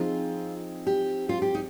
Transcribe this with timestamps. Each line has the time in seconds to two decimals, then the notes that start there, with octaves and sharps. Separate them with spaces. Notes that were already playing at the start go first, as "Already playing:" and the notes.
Already playing: F3 C4 D#4 F4 G#4
0.87 G4
1.29 F4
1.42 G4
1.55 D#4